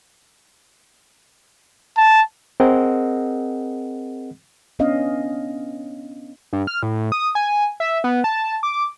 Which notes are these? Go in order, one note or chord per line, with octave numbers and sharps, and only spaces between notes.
A5
C4 G#4 A#4 D#5 F#5
B3 C#4 D4 D#5 F5
G2
F6
A2
D#6
G#5
E5
B3
A5
D6